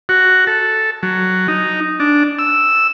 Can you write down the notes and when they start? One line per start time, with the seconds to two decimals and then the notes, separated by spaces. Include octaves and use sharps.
0.09 F#4
0.47 A4
1.03 F#3
1.48 D#4
2.00 D4
2.39 E6